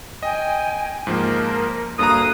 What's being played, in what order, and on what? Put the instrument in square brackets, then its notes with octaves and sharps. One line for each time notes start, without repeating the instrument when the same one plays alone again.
[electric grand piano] D#5 [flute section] G5 G#5
[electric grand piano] G#2 F3 A#3 [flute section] A#4
[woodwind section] D2 D#6 [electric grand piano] G2 A#3 A#5 [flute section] F5 F#6